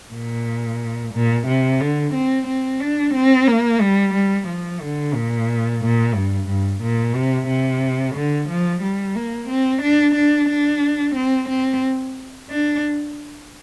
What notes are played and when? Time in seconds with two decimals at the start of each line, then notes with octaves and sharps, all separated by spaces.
0.13 A#2
1.14 A#2
1.47 C3
1.81 D3
2.14 C4
2.48 C4
2.80 D4
3.14 C4
3.47 A#3
3.81 G3
4.14 G3
4.48 F3
4.81 D3
5.14 A#2
5.82 A#2
6.14 G2
6.48 G2
6.82 A#2
7.15 C3
7.48 C3
8.16 D3
8.49 F3
8.83 G3
9.16 A#3
9.49 C4
9.82 D4
10.15 D4
10.49 D4
11.16 C4
11.49 C4
12.50 D4